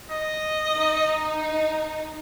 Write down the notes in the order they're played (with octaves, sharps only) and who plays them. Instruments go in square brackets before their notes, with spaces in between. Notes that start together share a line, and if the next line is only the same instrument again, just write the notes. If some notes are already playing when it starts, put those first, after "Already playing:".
[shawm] D#5
[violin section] D#4